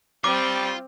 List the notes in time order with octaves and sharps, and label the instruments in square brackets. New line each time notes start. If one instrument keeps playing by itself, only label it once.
[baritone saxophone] G3 [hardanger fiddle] C4 [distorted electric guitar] F4 [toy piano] D6